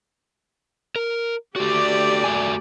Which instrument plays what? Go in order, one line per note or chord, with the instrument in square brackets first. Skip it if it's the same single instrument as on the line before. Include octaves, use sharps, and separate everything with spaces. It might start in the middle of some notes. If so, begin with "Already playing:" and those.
[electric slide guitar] A#4
[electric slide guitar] A3 F#4 [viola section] G4 D5
[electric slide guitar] A3 F#4 G#5